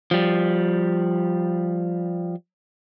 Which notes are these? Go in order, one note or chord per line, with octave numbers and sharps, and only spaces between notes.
F3 G3